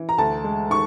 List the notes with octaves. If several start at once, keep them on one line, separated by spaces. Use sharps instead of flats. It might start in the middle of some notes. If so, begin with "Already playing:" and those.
Already playing: E3
A#5
D2 A5
G#3
D#3 C#6